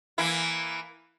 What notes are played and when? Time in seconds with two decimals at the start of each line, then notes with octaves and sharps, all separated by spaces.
0.18 E3 A#3 E4